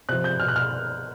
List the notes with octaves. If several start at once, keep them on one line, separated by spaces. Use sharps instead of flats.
C3 F3 F#6
G6
B2 F6
F#6
F6